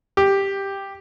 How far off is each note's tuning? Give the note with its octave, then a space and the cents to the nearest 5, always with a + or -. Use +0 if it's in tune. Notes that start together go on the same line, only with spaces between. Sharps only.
G4 +5